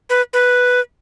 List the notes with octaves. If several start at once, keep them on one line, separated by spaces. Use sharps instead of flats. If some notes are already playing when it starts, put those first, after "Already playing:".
B4
B4